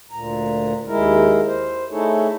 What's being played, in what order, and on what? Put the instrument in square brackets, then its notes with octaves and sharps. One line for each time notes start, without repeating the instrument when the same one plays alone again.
[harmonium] D2 A#2 A#5
D#2 G#3 E4 A#4
C5
A3 D#4 E4 G#4 A4 C#5